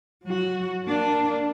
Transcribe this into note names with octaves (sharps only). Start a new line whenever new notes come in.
F#3 F#4
A#3 D4